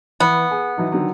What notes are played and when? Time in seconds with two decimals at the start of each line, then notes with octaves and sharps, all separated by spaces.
0.20 E3 B3
0.51 G#4
0.77 E3 F#3 D#4
0.92 D3 D#3 F#3